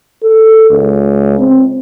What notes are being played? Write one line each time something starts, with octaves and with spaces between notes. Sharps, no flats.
A4
C#2
C4